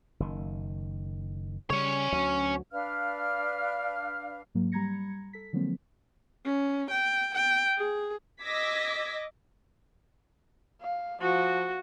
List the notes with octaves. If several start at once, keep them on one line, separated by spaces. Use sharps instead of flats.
F#1 D#3
C#3 G3 C#4 C#5
D2 F#3
D4 B4 F5 F6
G#2 F#3 A#3
G3 A#5 B5 G#6 A#6 C#7
A4 B6
D3 F3 F#3 G#3 A#3 C4
C#4
G5
G5
G#4
D#5 D6 E6 G#6 A#6 B6
F5
F3 F#4